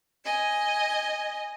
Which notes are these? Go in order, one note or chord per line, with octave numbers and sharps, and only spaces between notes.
D#5 G#5